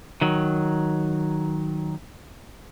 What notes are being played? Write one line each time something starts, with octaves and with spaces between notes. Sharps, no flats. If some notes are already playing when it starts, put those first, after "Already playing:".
D#3 F#3